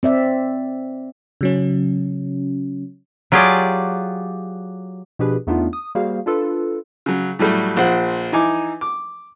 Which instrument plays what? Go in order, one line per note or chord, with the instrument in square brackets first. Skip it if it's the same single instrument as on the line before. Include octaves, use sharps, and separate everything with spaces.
[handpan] C4 D5 E5
[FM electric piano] C#3 F#3 C#4
[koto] F#3 F4 G4 G#4 D5
[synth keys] B2 F3 D4 G4 G#4 B4
E2 A3 B3 D4 D#4 F4
D#6
G3 A#3 F#4 G#4 C5 F5
D4 F4 A4 B4
[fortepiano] C#3 F#3
A2 F#3 G3 A3
A#1 F3 C5 F#5
E3 D#4 G#5 D6
D6